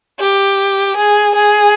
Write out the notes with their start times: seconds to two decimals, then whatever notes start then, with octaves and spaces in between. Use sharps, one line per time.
0.19 G4
0.96 G#4
1.35 G#4